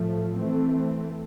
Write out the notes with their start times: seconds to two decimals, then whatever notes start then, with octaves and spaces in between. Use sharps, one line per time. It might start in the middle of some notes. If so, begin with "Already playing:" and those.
Already playing: A2 F3 A3
0.38 E3 A3 C4